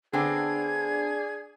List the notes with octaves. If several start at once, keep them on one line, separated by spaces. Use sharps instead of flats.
D3 B3 C4 D4 G#4 G#6